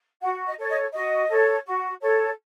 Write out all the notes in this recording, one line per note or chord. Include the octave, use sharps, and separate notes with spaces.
F#4 F#5
D#5
A4 C#5
D#5
F#4 D#5
A4 C#5
F#4
A4 C#5